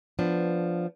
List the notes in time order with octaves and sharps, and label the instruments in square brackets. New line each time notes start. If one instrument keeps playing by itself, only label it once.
[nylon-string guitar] F3 B3 D4